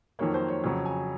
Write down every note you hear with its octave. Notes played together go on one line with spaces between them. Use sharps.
F2 D#3 F#3 A#3 C#5
C5
C#5
F2 C#3 F#3 C#5
G#5